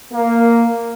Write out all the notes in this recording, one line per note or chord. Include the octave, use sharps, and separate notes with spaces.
A#3